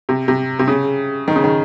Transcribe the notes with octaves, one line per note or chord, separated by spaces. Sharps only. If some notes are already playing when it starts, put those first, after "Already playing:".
C3
C3
C3
C#3
D#3
C#3
D#3